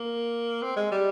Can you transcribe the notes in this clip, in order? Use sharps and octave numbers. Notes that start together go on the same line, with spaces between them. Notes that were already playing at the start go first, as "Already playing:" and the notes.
Already playing: A#3
C4
G#3
G3